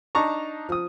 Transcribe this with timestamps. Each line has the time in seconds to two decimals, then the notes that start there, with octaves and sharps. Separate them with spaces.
0.15 D4 D#4 A5 A#5 C#6
0.69 F3 D#6